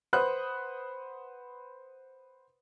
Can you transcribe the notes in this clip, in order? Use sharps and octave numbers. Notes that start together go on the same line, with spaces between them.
B4 C5 F#5 B5 D#6 F#6